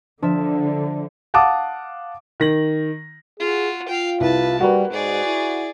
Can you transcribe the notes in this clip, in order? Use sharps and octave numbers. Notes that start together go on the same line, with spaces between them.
D3 F3 D4 E5
F5 F#5 A5 D6 D#6
D#3 A#6 F#7
F4 F#4 G#4
F4 F5 G5
C2 B4 A5
G3 A#3 F#4 B4
G#2 G#4 D5
E4